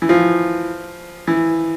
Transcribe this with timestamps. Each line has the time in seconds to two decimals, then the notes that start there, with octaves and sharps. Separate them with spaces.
0.02 E3
0.09 F3
1.27 E3